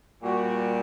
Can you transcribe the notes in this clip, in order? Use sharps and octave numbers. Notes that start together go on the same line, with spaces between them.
A#2 G3 F#4